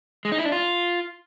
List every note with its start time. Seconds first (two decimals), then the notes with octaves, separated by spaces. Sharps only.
0.25 G#3
0.32 D#4
0.38 E4
0.45 D4
0.52 F4